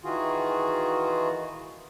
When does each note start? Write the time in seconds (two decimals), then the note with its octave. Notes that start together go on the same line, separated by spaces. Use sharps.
0.04 D#3 E3 F4 F#4 G#4